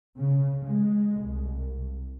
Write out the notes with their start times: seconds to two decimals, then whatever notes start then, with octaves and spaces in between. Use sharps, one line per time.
0.17 C#3
0.65 G#3
1.20 C2